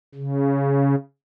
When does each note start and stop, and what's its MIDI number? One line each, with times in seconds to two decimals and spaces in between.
0.15 0.95 49